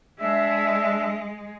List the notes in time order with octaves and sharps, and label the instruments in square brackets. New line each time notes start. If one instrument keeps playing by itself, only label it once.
[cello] G#3 [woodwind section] D4 E5